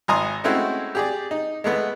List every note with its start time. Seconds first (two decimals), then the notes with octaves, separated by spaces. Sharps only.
0.08 G#1 D#5 G#5 A#5 C6 D#6
0.44 G#3 A3 C4 C#4 E4 F#4
0.95 G4 G#4 D5
1.31 D#4
1.64 G#3 A3 B3